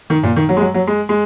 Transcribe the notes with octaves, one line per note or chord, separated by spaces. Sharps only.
D#3
A#2
D#3
F#3
G#3
F#3
F#3
G#3
G#3